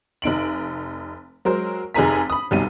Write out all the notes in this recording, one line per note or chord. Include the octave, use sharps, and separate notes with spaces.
F1 D#4 D7 F#7
F#3 G#3 A#4 C5
F1 D#4 G#4 G#5 A#5 B6
B5 D#6
F1 B1 G3 D#4 D#7